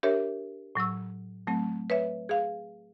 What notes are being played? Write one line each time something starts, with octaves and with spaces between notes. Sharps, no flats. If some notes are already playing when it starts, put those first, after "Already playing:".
D4 G4 A#4 C#5 E5
A2 F#3 C#6 E6
F#3 A3 C4
B4 C#5 E5
G#4 F5